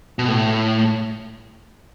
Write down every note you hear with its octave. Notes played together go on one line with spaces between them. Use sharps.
B2
A2